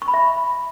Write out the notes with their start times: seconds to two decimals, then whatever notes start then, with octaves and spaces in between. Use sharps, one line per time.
0.02 C#6
0.08 B5
0.14 E5